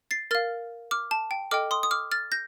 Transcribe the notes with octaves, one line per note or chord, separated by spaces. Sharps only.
A6 C7
A#4 F5 F6 A6
D6 F6
A5
G5
A4 D#5 G5 D6 F6
C6 D#6
D#6
D6 F6
F6 A6
G6 A#6